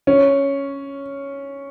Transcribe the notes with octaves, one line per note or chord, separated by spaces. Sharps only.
C#4